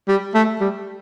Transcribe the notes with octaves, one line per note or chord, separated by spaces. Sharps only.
G3
A3
G3